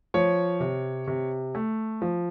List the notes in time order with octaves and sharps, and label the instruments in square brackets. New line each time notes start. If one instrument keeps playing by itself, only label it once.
[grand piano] F3 C#5
C3
C3
A3
F3